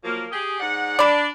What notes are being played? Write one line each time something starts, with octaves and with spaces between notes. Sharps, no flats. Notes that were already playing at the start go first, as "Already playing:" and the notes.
F3 F#3 A#3
G4 G#4
G#2 D5 F#5
D4 D5 B5